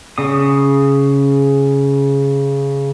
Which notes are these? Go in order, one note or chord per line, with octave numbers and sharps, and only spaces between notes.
C#3 D#6